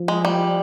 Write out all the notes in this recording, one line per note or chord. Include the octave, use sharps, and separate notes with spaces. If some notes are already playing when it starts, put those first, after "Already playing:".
Already playing: F3
G#3
G3